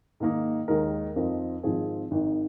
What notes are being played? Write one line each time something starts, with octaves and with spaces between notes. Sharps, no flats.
G#2 D#3 A#3 D#4
D#2 D#3 G#3 D#4 A#4
F2 F3 C4 D#4 A#4
G#1 G#2 F3 C4 G#4
G#1 G#2 D#3